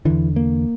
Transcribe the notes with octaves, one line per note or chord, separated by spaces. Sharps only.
E2 D3 E3
A#3